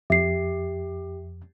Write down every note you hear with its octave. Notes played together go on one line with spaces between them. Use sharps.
F2 G4 E5 C7